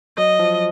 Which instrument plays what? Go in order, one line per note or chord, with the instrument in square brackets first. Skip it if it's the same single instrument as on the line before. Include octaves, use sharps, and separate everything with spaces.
[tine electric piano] F#3 [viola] D#5
[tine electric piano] F3